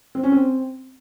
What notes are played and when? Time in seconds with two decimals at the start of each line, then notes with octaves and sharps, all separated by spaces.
0.15 C4
0.23 C#4
0.32 C4